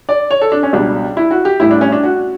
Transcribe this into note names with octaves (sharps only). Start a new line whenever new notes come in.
D5
C#5
A4
D4
C#4
C#2 B2 G3 D4
E4
F#4
G4
A1 A2 G3 E4
D4
C#4
D4
F#4